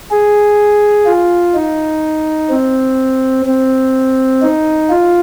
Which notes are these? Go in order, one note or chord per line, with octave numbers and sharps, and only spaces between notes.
G#4
F4
D#4
C4
C4
D#4
F4